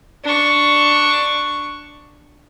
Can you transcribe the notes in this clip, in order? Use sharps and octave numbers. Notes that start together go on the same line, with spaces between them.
D4 C#6